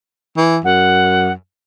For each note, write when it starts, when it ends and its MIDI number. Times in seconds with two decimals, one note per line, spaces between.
0.36 0.59 52
0.64 1.31 42
0.64 1.32 78